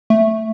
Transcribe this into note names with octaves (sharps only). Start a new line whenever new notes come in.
A3